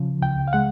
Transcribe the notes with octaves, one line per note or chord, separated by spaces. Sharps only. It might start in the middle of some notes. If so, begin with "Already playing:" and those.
Already playing: C#3 F3
C#2 G5
F5
G#3 F#5